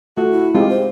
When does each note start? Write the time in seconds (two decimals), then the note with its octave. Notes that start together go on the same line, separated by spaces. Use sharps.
0.17 A3 F4 F#4
0.31 E4
0.55 G#3 C4 F4 G4
0.69 C5